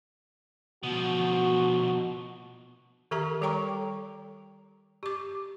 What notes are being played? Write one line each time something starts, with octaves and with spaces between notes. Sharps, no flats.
B2 F3 F#4
D#3 G4 A4 A#4 E5 A#5
G3 A4 C#5 G5 A#5 C#6
G4 D6